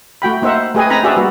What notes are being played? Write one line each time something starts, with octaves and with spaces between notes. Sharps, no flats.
A3 F#4 G5 B5
A#3 D#4 C5 E5 F#5
A3 G4 G#4 B4 D#5 G#5
C4 D#4 G#5 A#5 B5
D4 F#4 G#4 B4 D5 E5
G3 A#3 F#4 B4